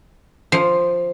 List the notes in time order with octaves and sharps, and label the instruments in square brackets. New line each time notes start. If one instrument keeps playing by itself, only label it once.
[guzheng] F3